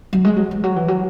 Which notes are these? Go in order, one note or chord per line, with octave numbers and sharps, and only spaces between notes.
F#3
G#3
F#3
E3
F#3
E3
F#3